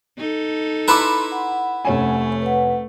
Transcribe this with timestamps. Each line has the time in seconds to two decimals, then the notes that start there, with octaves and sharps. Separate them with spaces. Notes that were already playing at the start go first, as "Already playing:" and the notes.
0.18 D#4 A4
0.88 E4 B4 A5 A#5 C6 D6
1.32 F#5
1.85 F1 A3 C#4 G#5
2.42 B4 F#5